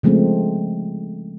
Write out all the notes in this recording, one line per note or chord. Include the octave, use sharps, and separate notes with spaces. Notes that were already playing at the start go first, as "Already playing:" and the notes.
C#3 F3 G#3 A3 C4